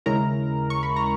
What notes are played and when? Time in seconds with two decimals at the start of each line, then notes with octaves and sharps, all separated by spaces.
0.06 D#2 C#3 G#3 C#4 E4 A#4 A#5
0.70 C#6
0.83 B5
0.96 A#5